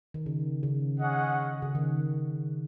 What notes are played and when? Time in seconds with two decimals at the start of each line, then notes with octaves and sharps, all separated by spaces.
0.14 D#3
0.26 C#3
0.63 C#3
1.00 C#4 G#4 D#5 F#5
1.62 C#3
1.75 D#3